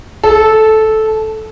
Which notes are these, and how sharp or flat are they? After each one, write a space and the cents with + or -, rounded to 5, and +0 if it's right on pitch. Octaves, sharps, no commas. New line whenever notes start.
A4 -10